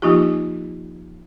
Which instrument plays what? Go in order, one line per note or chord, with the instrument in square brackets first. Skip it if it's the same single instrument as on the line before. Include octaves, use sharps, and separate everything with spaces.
[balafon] F3 A#3 D#4 F4 G4